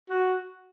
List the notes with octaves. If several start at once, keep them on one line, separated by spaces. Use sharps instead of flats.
F#4